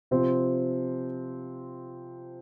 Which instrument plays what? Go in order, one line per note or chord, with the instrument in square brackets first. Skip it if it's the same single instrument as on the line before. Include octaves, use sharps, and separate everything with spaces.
[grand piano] C3 F3 C4